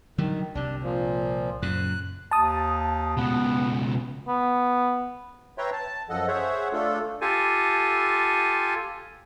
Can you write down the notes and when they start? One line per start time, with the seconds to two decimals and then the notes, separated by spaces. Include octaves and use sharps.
0.18 D3 D#3 F#3 G3
0.55 C2 C3 D4
0.83 A#2 F3
1.62 F#2 A#2 C#3 F#6
2.31 D#2 A5 D#6
3.17 C#2 B2 B3
4.28 B3
5.58 B4 C#5 E5 G5 A#5 C6
5.73 A5
6.10 F#2 F3 A4 D#5 F#5
6.28 G#4 C5 C#5 E5 F#5
6.73 A3 D4 F4 A4
7.21 F4 G4 A4 G#5